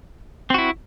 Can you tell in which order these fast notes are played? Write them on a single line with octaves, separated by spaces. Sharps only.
C4 F#4 E4